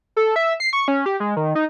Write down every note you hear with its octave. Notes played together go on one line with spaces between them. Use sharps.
A4
E5
C7
C#6
C#4
G4
G#3
D#3
D#4